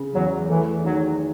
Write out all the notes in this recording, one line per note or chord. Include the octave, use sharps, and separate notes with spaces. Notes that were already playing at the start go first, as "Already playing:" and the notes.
Already playing: C#3
E2 F#3
E3 A3
D#3 F#3